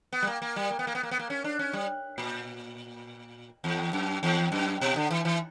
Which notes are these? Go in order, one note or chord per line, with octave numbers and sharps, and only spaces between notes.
B3
G3
A#3
A#3
G3
A#3
B3
A#3
B3
A#3
B3
A#3
C#4
D4
C#4
G3
A#2
E2
F#2
E2
F#2
B2
D3
E3
E3